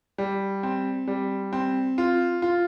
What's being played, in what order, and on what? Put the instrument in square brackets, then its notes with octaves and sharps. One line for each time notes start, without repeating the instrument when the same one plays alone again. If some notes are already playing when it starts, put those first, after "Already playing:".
[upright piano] G3
C4
G3
C4
F4
F4